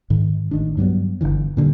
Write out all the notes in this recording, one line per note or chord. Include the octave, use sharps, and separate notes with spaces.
G#2 D#3
A1 D#3 D4
G2 F#3 G3 B3
G1 D#2 D3 E3
A#2 D3 F3 G3